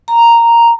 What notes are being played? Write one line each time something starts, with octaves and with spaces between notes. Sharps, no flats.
A#5